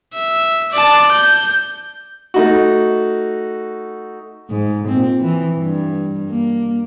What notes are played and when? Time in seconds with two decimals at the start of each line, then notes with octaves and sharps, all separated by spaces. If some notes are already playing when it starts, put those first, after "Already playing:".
0.14 E5
0.72 D5 A5
1.11 G6
2.34 A3 D#4 F#4
4.50 G#2
4.88 A#2 C4
5.20 E3
5.59 G2
6.29 A#3